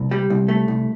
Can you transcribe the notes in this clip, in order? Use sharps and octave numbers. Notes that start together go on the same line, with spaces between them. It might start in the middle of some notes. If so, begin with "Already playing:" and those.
Already playing: C2
G3
C2
A3
C2